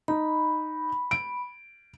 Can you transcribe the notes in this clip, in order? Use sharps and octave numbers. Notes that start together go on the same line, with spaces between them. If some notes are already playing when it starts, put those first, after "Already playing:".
D#4 B5
D7